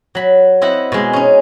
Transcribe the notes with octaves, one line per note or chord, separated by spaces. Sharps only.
F#3 B5
C4 E4 D#5 F#5
B2 G#3
C#4 D#4